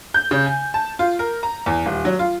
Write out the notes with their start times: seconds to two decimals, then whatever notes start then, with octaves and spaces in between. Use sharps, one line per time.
0.14 G6
0.31 C#3
0.46 G#5
0.74 A5
0.99 F4
1.19 A#4
1.43 A#5
1.66 E2
1.86 D#1
2.05 F#3
2.19 F4